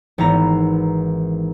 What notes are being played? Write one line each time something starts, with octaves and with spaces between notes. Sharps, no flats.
G#1 E3 B3 A#5